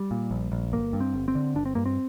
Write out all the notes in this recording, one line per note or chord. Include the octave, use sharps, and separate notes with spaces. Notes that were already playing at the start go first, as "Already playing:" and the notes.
Already playing: G3
A#2
A#1
A#1
G1 A#3
G2
C4
G1
C4
D3
G1 D4
C4
G2 A#3
C4